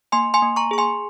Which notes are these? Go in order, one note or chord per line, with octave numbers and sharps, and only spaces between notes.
A#3 G#5 C6
G#5 C6
A#3
A#5 C#6
G#4 C#6
G#5 C6